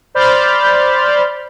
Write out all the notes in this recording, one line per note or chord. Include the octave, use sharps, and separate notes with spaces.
C5 D5 B5 F6 G6 A6